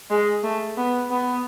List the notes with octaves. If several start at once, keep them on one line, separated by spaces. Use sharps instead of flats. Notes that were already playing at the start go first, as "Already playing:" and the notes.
G#3
A3
B3
B3